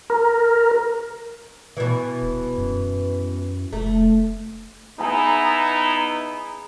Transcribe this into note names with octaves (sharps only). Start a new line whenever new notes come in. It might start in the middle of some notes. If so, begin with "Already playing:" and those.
A#4
B2 E3
D#1
F#2
F1 A3
B3 D#4 E4 G#4 A#5 B5